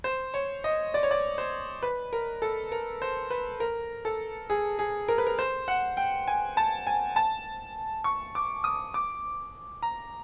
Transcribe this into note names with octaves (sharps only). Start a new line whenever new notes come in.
C5
C#5
D#5
D5
C#5
D5
C5
B4
A#4
A4
A#4
C5
B4
A#4
A4
G#4
G#4
A#4
B4
A#4
C5
F#5
G5
G#5
A5
G#5
A5
C#6
D6
D#6
D6
A#5